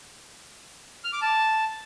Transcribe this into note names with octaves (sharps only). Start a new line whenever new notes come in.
F6
D6
A5